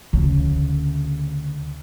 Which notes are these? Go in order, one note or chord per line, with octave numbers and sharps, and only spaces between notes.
D2 C#3